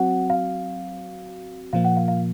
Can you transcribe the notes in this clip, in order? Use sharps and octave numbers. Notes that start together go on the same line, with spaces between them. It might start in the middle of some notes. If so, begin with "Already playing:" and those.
Already playing: F#3 C4 F#4 F#5
F5
A#2 F3 A#3 F5
F#5
F5
F5